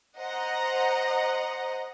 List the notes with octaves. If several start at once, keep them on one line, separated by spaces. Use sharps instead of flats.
C5 D#5 F#5 A#5